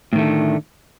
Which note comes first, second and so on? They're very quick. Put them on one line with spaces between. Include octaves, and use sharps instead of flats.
A2 D#3 A3 D3